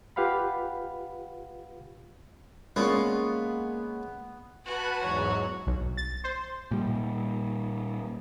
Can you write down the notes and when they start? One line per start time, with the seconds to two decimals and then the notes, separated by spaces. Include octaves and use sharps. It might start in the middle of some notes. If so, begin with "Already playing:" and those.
0.16 F4 G4 B4 F5 F#5 B5
2.76 G#3 A#3 B3 C#4 F4 D5 C#6
4.66 F#4 B4 F#5 G#5 A5
5.01 E2 G#2 F#3 C#5
5.67 B1
5.97 A6
6.24 C5
6.71 A#2 G3